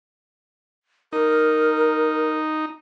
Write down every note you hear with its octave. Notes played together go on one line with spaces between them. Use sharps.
D#4 A#4